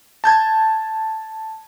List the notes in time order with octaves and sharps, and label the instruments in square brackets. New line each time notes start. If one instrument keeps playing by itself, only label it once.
[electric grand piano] A5 G6 G#6